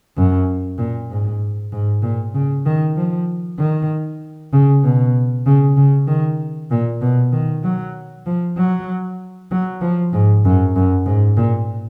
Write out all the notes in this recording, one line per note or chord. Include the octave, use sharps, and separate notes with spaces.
F#2
A#2
G#2
G#2
A#2
C#3
D#3
F3
D#3
C#3
B2
C#3
C#3
D#3
A#2
B2
D#3
F#3
F3
F#3
F#3
F3
G#2
F#2
F#2
G#2
A#2